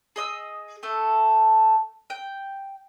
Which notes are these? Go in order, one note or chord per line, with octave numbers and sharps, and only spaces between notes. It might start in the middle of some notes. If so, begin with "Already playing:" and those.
G#4 D#5 D#6 E6
A3 A4
G5